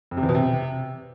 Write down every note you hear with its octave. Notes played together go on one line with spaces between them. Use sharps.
F2
C3
E2
B2
C3